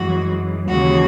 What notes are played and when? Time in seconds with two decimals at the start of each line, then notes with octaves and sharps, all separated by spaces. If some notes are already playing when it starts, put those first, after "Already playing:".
Already playing: F#2 E3 G#3 F#4
0.67 D#2 C#3 E3 G#3 F#4